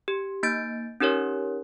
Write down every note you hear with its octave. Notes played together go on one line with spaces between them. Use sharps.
G4
A#3 D#4 G6 A6 D7
C#4 D#4 G4 A#4 C#5